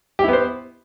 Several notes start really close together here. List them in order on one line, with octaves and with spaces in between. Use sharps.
G4 E4 B3 C5